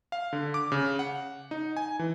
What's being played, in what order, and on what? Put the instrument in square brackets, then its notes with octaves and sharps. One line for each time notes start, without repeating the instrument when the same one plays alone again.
[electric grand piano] F5
D3
D6
C#3
F#5
D#4
G#5
E3